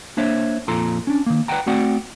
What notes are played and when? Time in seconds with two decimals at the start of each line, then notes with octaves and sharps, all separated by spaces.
0.17 A#3 D4 C5 C#5 E5
0.68 F2 A#2 F4 A4 A#5 C6
1.07 C#4 D4
1.26 D#3 A#3
1.48 B4 D5 E5 F#5 G5 A#5
1.66 A3 C4 F#4 D5 F#5 G5